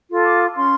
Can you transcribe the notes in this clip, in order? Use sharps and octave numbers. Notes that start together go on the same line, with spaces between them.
F4 A4
D6
C#4 C6